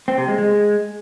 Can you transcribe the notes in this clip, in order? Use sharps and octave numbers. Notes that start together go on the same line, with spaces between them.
C4
C3
G#3
G#3